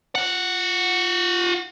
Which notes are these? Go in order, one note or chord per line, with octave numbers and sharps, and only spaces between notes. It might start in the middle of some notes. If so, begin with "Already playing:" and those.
F4 F#5